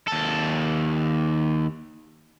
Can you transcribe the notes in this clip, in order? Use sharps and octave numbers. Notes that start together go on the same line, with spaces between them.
D#2 A4